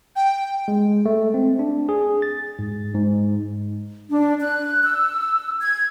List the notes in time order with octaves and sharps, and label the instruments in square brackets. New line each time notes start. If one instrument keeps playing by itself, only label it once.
[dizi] G5
[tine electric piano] G#3
A3
C4
D4
G#4
A6
G#2
G#2
[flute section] D4
F#6
E6
G#6